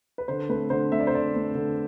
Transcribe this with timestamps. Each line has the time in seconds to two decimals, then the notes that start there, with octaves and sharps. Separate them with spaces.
0.18 B4
0.28 D3 C5
0.49 A3 C4 B4
0.70 D3 C5
0.91 A3 C4 E5
1.00 D5
1.07 C5
1.12 D3 D5
1.34 A3 C4
1.55 D3